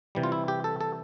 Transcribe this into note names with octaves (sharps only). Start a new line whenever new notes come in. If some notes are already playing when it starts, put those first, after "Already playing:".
C3 E3 G3
F4
E4
G4
A4
A4